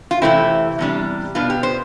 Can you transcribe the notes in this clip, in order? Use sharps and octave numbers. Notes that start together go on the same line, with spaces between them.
F4
C3 E3 A3 C4 E4
E2 C3 G3 D4
B2 B3 D4 F4
G4
C5